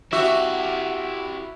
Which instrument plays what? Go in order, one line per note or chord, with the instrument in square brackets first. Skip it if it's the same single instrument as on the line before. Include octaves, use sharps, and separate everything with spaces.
[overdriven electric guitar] E4 G4 [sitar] F#4 [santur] E5